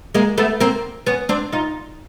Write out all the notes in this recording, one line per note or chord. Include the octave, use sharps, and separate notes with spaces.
G#3 A#3
A3 B3
A#3 C4
B3 C#4
C4 D4
D#4 F4